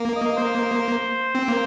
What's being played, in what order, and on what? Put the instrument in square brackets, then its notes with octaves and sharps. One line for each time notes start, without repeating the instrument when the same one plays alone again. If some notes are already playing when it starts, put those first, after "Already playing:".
Already playing: [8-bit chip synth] A#3
[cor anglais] D#5
C5
[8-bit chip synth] C4
A#3